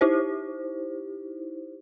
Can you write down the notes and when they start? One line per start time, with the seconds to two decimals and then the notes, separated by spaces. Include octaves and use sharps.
0.01 D#4 E4 G4 C5